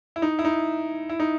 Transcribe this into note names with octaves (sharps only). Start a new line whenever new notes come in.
E4
D#4
E4
D#4
E4
D#4